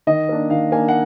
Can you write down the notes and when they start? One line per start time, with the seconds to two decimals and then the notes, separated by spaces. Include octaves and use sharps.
0.07 D#3 D#5
0.29 A#3 D4
0.50 D#3 F5
0.72 A#3 G#5
0.75 D4
0.88 F#5